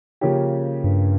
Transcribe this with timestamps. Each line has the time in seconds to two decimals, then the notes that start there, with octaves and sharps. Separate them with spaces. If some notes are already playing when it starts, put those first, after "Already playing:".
0.21 C#3 F3 A#3 C#4 G4
0.84 G2